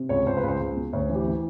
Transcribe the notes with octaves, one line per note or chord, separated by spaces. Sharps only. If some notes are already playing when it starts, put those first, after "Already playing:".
Already playing: C3
C#2 C#5
C#2 C5
B4
C#2
C5
C#2
B2
D2 C#5
E3
G4
E3